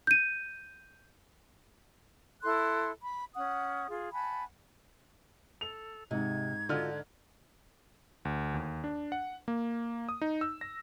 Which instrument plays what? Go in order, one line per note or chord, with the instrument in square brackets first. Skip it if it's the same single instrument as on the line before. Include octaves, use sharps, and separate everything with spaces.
[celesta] G6 D#7
[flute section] E4 A4 C6 F#6
B5
C#4 F#5 D#6
F4 G#4
F#5 G#5 A5 B5
[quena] A4 [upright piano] F7
[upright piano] G#2 D#4 [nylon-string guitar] C3 [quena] G#6
[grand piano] D3 D4 F6 [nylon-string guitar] F4 F#4 D#5
[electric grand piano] D2
D#2
D4
F#5
A#3
D#6
D#4
E6
A#6